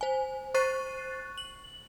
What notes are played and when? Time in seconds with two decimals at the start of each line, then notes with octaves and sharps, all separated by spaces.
0.01 C5 G#5
0.54 C5 C#6 F#6 A6 C7 D#7
1.38 F#7